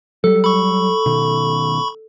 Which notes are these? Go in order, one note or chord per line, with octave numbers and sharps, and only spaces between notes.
F#3 G3 A4
A4 B5 C#6
B2 D#3